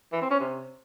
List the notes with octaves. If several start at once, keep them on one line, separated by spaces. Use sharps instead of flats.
E3
C4
C#4
C3